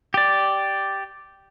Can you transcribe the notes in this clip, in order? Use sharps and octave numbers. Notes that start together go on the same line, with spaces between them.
G4 D5